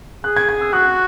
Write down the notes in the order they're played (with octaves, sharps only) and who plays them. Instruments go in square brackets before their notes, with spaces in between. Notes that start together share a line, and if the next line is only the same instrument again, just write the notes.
[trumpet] G#4 [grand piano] F#6
[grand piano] G#6
G#6
E6
[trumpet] F#4 [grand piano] F#6